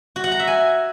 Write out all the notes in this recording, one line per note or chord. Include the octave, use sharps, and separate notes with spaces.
F#4
F#5
A#5
E5
G#5